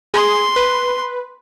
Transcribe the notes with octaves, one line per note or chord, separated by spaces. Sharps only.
G#4 C6
B4